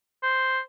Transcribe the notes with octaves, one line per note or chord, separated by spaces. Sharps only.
C5